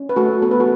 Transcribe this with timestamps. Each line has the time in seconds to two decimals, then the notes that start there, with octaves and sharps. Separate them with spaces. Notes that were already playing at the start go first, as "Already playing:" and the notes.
Already playing: C#4
0.09 B4
0.16 A3 F#4 A4
0.42 B3 A4
0.51 B4
0.60 F#4 A4